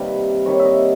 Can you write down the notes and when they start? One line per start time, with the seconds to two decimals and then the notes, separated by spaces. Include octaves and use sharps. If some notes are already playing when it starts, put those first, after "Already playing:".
Already playing: C3 D#3 G3 A#3 B4
0.45 C3 D#3 G3 A#3 C#5
0.59 E5
0.65 D#5